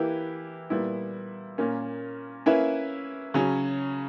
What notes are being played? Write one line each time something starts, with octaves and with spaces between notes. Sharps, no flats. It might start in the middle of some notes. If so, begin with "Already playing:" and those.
Already playing: E3 A#3 E4 G4 B4
A#2 G3 B3 E4
A#2 A#3 C#4
A#3 C#4 E4 B4 E5
C#3 F#3 C#4